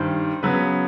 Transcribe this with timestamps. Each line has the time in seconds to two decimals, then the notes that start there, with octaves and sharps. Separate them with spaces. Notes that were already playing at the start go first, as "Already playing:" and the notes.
Already playing: G2 D#3 G3 C5
0.43 C#3 F#3 B3 B4